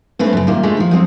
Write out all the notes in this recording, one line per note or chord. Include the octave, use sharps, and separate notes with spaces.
G2 A3 C4 C#4 B4
F#2 C#3
C3 D#3 G3 A#3 F4
G2 F3 G#3 A3
D#3 F3
F3 F#3 A#3 C4